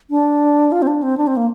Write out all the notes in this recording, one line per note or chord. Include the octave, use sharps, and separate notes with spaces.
D4
F4
C4
D4
C4
D4
C4
A#3